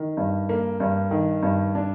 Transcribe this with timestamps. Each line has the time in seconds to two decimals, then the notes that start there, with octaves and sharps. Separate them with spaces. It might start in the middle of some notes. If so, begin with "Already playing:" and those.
Already playing: D#3
0.17 G2
0.49 A#3
0.80 G2
1.11 D#3
1.43 G2
1.75 D4